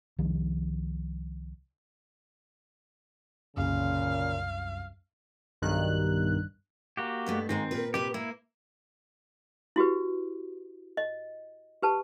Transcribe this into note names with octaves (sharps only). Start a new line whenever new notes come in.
C2 D#3 F3
C2 F#2 A#2 C#3 F5
B1 G2 D#3 F#6
A#3 F#4 G4
G2 B2 A3
G#2 D#3 G#3 A#3 C4
A#2 A#4 B4
C3 G4 B4
A#3 E4
E4 F#4 G4 B4
D#5
G4 B4 A5